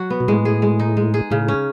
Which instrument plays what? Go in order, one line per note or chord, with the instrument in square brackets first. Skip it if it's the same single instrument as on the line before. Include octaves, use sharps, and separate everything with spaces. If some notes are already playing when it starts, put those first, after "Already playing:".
Already playing: [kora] F#3 F#4
B3
[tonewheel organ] B2
[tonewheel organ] A2 [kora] G#3
[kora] G#4
G#3
D#4
G#3
G#4
[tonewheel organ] A2 [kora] C#3
[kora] C#4